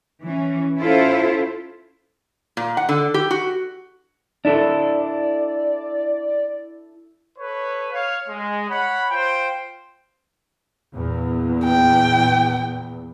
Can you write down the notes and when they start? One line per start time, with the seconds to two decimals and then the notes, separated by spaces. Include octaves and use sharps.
0.23 E3 C#4
0.80 C#4 E4 F4 A4 C5
2.57 A#2
2.77 F#5
2.89 D3
3.14 G4
3.31 F#4
4.45 D4 E4 A4 D5
7.39 A4 B4 C#5
7.93 C#5 F5
8.29 G#3
8.70 C#5 F#5 B5
9.11 F4 C5 G5
10.93 E2 A#2
11.65 G5